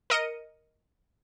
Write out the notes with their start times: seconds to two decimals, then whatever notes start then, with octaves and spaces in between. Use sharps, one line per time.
0.10 A#4 D#5 C#7 D#7